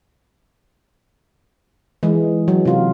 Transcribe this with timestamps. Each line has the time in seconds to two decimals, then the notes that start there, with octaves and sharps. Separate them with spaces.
2.03 E3 G#3
2.48 F#3
2.65 C3 F4